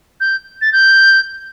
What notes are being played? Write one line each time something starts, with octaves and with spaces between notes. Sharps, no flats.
G6
A6
G6